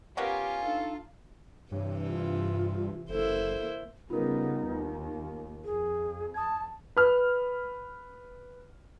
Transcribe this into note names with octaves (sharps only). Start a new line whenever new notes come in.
A#3 B3 C#4 F4 G4 G#5
D4 D#4 A4 F5
G2 C3 E3 C#5
F4
F#1 A#3 E4 A4 C5
C#3 G3 B3 D#4 F4 A#4
D#2
F2 G#4
A5 D#6 G#6
B4 F6